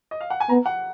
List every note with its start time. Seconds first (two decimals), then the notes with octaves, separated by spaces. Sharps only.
0.11 D#5
0.21 F5
0.30 F#5
0.40 G#5
0.49 B3 A#5
0.66 F#5